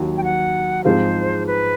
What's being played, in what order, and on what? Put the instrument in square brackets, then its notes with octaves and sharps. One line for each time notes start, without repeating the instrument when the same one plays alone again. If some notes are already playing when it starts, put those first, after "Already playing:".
Already playing: [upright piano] D#2 D#3 F#3
[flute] G5
F#5
[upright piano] G#2 F3 G#3 C4 F4 [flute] C5
[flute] B4